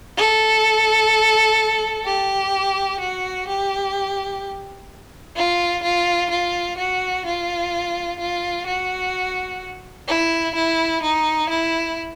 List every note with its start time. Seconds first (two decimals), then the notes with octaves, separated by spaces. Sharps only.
0.17 A4
2.06 G4
3.00 F#4
3.48 G4
5.36 F4
5.83 F4
6.31 F4
6.78 F#4
7.26 F4
8.20 F4
8.67 F#4
10.08 E4
10.55 E4
11.03 D#4
11.50 E4